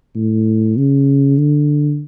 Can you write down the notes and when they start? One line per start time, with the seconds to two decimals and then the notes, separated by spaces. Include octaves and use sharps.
0.16 A2
0.77 C#3
1.38 D3